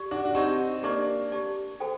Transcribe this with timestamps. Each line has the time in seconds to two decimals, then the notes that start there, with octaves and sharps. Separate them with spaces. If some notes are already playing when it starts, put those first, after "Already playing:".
Already playing: G4 D5
0.11 D4 F#4
0.25 F#4
0.35 C4 D#4 G4 D5 A5
0.83 A#3 D4 G4 D5 A5
1.32 G4 D5 A5
1.80 F#4 A4 C5 G5 A#5